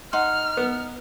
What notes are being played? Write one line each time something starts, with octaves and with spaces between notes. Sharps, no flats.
D#4 F#5 C6 F6
B3